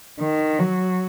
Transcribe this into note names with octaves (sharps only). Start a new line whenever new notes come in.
D#3
F#3